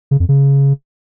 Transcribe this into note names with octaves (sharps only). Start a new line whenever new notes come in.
C#3
F2
C#3